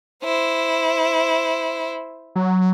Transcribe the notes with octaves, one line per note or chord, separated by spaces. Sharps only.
E4 C5
F#3